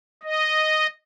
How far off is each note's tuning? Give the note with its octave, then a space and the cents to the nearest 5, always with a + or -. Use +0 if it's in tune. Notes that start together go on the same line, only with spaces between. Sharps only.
D#5 -5